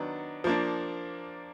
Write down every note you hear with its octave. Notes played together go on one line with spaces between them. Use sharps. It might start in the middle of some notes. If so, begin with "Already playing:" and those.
Already playing: D#3 F#3 B3 D4
F3 A#3 D4